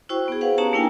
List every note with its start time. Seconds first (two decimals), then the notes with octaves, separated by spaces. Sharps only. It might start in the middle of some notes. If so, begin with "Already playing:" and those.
0.09 E4 F#4 C5 G5 C#6
0.28 B3 G#4
0.41 B4 C5 F5 F#5
0.58 C#4 D#4 G4 C#5 A5 A#5
0.73 A#3 D4 E4 A#4 G5 G#5